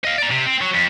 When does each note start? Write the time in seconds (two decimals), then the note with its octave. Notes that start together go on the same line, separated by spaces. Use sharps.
0.05 D#5 F5
0.18 D5 A#5
0.31 C3
0.46 C4
0.61 F#3
0.74 F2